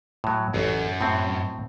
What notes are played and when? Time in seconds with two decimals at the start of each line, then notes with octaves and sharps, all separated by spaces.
0.24 A2 F#3
0.54 A1 F#2
1.01 A2 C4